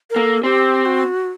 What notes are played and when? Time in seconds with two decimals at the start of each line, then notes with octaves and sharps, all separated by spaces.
0.10 A#4
0.16 A#3 A4
0.44 C4 G4
0.85 F#4